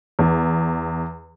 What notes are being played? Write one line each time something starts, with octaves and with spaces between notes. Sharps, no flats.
E2